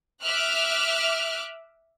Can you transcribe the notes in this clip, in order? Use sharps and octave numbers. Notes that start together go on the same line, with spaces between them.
E5 D6 F6 F#6